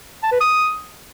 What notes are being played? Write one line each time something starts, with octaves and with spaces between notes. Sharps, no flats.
A5
B4
D#6